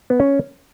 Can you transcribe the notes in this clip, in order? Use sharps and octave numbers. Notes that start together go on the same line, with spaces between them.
B3
C#4